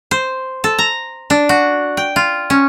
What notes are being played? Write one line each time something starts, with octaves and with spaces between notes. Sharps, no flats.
C5
A4
A#5
D4
F#4
G5
F4
C#4